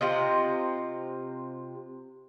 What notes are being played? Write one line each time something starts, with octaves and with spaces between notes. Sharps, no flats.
C3 F4 D#5